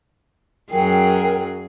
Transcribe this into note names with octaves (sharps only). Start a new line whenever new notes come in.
F#2 F#3 G#4 A#4 G5